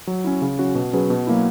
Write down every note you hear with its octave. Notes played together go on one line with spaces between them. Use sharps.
F#3
C#4 E4
C#3
F#3 C#4 F#4
B2
F#3 C#4 G#4 B4
B2
F#3 A#3 E4